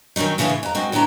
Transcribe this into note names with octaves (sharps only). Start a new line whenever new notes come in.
D#3 F#3 A3 C#4 D#4
A2 C#3 E3 C#4 F4
E3
F2 A#5
G#3 C4 F#4
D3 F#3 B3 E4 A#5